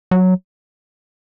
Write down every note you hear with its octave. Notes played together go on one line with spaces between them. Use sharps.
F#3